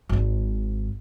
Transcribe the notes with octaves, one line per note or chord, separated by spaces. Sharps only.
G#1 G#2